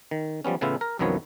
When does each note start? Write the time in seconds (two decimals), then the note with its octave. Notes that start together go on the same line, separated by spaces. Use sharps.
0.11 D#3
0.44 F3 G3 B3 C#4
0.61 A2 C#3 E3 B3 E4 F4
0.81 A#4
0.99 C2 F#2 D#3 F3 B3 C#5